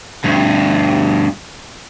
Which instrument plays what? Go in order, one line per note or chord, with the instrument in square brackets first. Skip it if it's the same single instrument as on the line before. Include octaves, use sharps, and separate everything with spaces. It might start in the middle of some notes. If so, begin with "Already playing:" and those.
[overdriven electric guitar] D2 G2